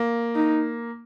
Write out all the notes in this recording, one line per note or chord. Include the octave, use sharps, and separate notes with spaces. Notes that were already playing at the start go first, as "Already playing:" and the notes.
Already playing: A#3
D#4